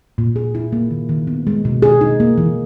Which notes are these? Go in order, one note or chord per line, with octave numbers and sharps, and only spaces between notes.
A#2
G#4
E4
A#3
D#3
D#3
B3
G#3
B2
G#4
D#4
A#3
E3